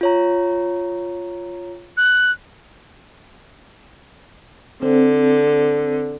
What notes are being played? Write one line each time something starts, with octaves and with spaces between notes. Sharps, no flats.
F4 C#5 A#5
F#6
D3 C4